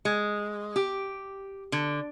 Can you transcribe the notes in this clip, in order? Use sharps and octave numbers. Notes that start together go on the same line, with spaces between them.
G#3
G4
D3